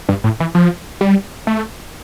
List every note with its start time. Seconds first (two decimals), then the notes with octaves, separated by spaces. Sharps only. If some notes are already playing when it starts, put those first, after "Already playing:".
0.09 G2
0.24 A2
0.40 E3
0.55 F3
1.01 G3
1.47 A3